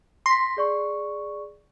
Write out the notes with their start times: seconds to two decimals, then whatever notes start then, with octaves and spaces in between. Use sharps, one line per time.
0.26 C6 A#6 B6
0.57 G#4 D5 C#6